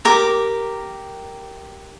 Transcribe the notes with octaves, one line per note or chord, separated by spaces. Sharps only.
G4 A#4 D6